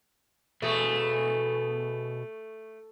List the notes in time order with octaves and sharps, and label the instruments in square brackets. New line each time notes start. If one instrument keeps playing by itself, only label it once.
[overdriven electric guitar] B2 G#4 [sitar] A3